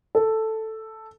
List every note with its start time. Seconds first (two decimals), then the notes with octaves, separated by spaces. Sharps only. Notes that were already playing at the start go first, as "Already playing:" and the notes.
0.15 A4